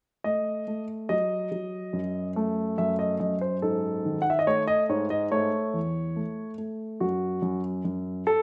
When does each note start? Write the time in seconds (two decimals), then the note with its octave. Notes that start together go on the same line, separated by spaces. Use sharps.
0.24 A3 D#5
0.67 A3
1.09 F#3 D#5
1.52 F#3
1.93 F#2
2.36 A3
2.78 F#2 E5
2.99 D#5
3.20 F#2 D#5
3.41 C5
3.62 G#2 A4
4.05 D#3
4.22 F#5
4.30 E5
4.39 D#5
4.47 A3 C#5
4.68 D#5
4.89 G#2 C#5
5.10 D#5
5.32 A3 C#5
5.74 E2
6.16 A3
6.58 A3
7.00 F#2 F#4
7.42 F#2
7.85 F#2
8.27 A4